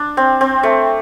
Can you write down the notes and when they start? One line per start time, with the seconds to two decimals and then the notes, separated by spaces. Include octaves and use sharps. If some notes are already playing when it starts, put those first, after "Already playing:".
Already playing: D4
0.17 C4
0.41 C4
0.63 A3